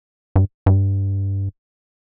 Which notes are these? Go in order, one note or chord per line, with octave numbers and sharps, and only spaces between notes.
G2
G2